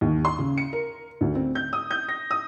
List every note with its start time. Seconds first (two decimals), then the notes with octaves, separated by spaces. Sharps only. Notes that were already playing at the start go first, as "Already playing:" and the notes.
0.01 D#2
0.25 C6
0.38 C#3
0.58 C#7
0.73 A#4
1.21 D2
1.35 C4
1.55 G6
1.73 D#6
1.91 G6
2.09 A#6
2.31 D#6